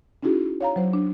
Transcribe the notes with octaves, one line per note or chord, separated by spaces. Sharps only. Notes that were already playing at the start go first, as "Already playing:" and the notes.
C#4 D#4 E4 F#4 G#4
C#5 F5 A#5
F#3 C5
D4